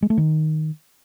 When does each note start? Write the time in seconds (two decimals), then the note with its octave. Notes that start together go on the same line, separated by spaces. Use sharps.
0.02 G#3
0.10 A3
0.17 D#3